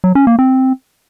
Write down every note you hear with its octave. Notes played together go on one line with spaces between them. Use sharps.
F#3
C#4
A#3
C4